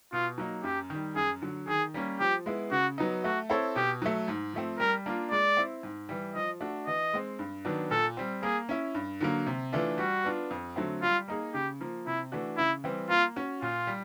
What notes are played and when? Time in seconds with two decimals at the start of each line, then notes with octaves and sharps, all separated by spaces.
0.13 B2 F4
0.38 F#3 A#3 D#4
0.64 F#2 G4
0.90 D#3 G3
1.16 F#2 G#4
1.42 D3 F#3
1.68 D#3 G#4
1.94 G3 A#3 C#4
2.20 F3 G4
2.46 G#3 B3 E4
2.71 C#3 F#4
2.98 F#3 B3 D#4
3.24 A3 F#4
3.49 C4 E4 A4 C#5
3.76 B2 G4
4.02 F#3 A3
4.28 G#2
4.53 F3 A3 C4
4.79 G3 A#4
5.06 A#3 D4 F4
5.31 G#3 D5
5.57 C4 E4
5.83 G#2
6.09 E3 G3
6.35 F3 D#5
6.60 A3 D4 F#4
6.87 E3 D#5
7.13 G#3 C4
7.39 G2
7.65 D#3 F#3 B3 D4
7.91 A#2 A4
8.17 G3 C4
8.43 A#3 G#4
8.69 C#4 E4
8.95 G2
9.20 D3 F#3 A#3
9.47 C3
9.72 E3 A3 D4 F4
9.98 G3 F#4
10.24 B3 D4 F4
10.51 F2
10.76 D3 F#3 A3 C4
11.02 G3 F4
11.28 A#3 D#4 G#4
11.54 C#3 G4
11.81 F3 A#3
12.06 C3 E4
12.32 E3 A3 D4 F#4
12.57 C#3 E4
12.84 E3 G3 C4
13.09 A#3 F4
13.36 C#4 F#4
13.61 A#2 F4
13.87 G3